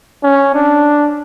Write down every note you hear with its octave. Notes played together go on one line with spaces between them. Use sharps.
C#4
D4